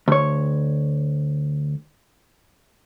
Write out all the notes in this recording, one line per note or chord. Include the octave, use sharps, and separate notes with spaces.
D2 C#5